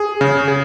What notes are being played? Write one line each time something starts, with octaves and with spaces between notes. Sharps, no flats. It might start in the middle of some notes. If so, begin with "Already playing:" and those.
Already playing: G#4
C#3
G#4